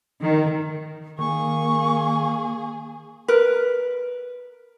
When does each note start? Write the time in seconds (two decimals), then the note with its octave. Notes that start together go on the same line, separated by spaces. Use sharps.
0.20 D#3
1.19 D#3 A#3 G#4 C#6
3.28 A#4 B4